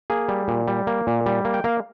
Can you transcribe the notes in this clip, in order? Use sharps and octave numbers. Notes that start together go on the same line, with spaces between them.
A#3 G#4
G3
A#2
G3
A#3
A#2
G3
A#3
G5
A#3 F5